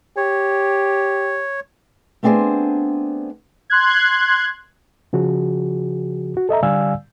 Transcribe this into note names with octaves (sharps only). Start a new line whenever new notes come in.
G4 C#5
A3 B3 C4 D4 G#4 C5
C6 F#6 G#6
C#3 F3 F#4 G#4
F#4
A4 D#5 E5 A#5
D3 G3 D5 F5 G#5 E6